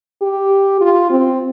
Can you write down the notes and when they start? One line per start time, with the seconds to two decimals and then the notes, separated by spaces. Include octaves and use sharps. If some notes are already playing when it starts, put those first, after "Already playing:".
0.22 G4
0.81 F4
1.10 C4